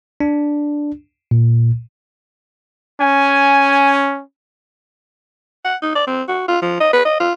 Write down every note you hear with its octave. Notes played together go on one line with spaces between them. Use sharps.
D4
A#2
C#4 G#5
F#5
D#4
D5
C4
F#4
F4
F3
D#5
B4
D#5
F4